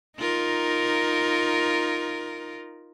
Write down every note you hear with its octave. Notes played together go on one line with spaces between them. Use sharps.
D#4 F4 A#4